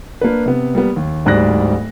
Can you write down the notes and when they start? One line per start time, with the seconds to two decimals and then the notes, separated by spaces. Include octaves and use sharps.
0.21 A#3 D4 B4
0.46 C3 B3
0.75 G3 A#3 B3
0.96 D#2
1.26 D1 G#2 G3 D5 F#6 A#6